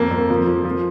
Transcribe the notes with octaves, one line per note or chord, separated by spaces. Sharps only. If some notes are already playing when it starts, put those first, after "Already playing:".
Already playing: F2 A#3
F2
F3
F3
F3